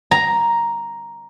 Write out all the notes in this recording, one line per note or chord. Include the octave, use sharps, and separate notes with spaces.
A#5